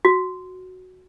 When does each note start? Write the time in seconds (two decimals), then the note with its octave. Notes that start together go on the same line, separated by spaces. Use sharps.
0.05 F#4